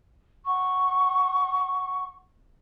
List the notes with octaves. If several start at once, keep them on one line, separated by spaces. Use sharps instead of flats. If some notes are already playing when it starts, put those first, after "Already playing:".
F#5 C#6